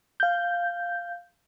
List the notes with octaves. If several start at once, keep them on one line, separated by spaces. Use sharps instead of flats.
F5 G6